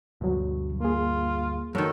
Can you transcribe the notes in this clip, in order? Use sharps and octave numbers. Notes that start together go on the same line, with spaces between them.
D2 G2 B2 F#3
A#3 F4 G#4
F#2 D#3 A4